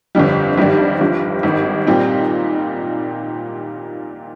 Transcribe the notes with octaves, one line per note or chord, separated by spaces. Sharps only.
G1 F2 D3 G3
G#1 G2 D#3 G3 D4
G1 G2 F3
G#1 G2 D#3
A#2 G3 C4 D#4